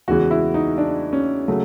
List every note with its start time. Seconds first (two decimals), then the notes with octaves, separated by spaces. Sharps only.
0.08 E2 C#3 E3 G#3 F#4
0.31 E4
0.54 D#4
0.78 D4
1.13 C#4
1.48 C#3 F#3 A3